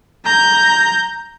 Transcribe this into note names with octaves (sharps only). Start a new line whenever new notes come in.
A#5 G6